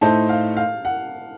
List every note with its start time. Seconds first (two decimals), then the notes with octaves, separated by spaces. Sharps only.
0.01 A2 A3 D#4 A4 C5 A5
0.29 F5
0.57 F5
0.85 F#5